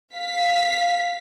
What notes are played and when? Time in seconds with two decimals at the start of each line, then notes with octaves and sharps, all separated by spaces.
0.15 F5 B6